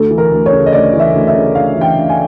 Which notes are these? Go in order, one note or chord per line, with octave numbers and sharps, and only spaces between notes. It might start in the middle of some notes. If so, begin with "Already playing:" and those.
Already playing: D2 A4
E3
A#4
D2
C#5
C#3
D#5
D2 D5
E3
E5
D2
E5
C#3
D2 F5
E3
G5
D2
G#5